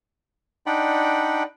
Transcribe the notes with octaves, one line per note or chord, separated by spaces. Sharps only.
D4 D#4 D5 F#5 G5 B5